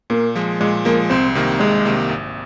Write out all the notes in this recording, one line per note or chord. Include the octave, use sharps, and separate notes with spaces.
A#2 A#3
F3 G#3
A#2 G#3
F3 G#3 A#3
C2 C4
C3 D#3 A#3
C2 G#3
C3 D#3 A#3
G#1